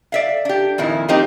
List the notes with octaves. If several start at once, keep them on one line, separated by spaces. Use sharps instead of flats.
D5 E5 F5
D4 G4
F2 A#2 D#3 E4
F3 A#3 C4 D#4 G4